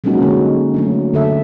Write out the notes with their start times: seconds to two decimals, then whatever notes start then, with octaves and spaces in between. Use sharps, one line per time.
0.04 F#3 G#3 A#3 C#4 D#4 F#4
0.22 D3 G3 G#3
0.74 F#3 A3 D4
1.14 D3 A4 E5